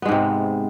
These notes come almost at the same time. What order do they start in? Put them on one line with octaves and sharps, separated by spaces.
B3 G#3 G#2 C3